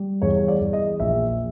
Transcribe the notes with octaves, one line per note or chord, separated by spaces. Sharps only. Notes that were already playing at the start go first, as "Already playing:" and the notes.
Already playing: G3
E2 C#5
D5
E2
D#5
A#1 E5